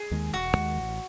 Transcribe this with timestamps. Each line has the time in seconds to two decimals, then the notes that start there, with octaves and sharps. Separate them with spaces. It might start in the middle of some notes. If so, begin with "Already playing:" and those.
Already playing: G#4
0.11 D#2 D#3 G#3
0.34 E1 F#4
0.55 D#2 D#3 G#3
0.76 A1